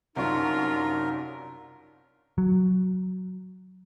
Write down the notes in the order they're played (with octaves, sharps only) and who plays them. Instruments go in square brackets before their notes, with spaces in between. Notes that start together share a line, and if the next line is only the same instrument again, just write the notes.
[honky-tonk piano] C2 F#2 C#6 [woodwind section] F3 D4 D#4 [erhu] F4 [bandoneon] A#4
[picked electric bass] F#3